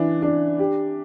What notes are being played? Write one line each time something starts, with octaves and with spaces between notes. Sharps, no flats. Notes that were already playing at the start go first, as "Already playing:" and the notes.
Already playing: E3 D4
D4
G4